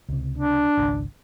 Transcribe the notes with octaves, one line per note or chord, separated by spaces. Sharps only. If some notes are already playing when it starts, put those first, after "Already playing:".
C#2 C3
D4
G#1 C#2